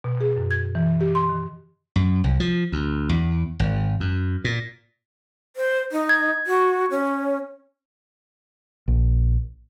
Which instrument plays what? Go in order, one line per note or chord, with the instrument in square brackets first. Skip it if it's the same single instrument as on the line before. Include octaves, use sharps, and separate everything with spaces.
[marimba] B2
G#4
F#2
G#6
E3
G4
C6
D#3
[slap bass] F#2
C2
F3
D2
E2
G#1
F#2
A#2
[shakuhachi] C5
D#4
[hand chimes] G#6
[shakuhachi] F#4
C#4
[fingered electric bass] A#1